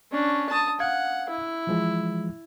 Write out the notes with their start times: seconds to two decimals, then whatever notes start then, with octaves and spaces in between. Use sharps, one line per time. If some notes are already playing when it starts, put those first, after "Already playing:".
0.12 C#4 D4
0.49 A5 D#6
0.80 F5 F#5 G#6
1.29 E4
1.67 E3 F3 G#3